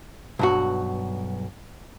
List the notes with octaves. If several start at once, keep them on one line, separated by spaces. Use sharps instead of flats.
B1 G2 F#4